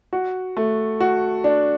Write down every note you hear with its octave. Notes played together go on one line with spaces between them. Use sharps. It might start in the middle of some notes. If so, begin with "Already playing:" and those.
F#4
A3
F#4
D4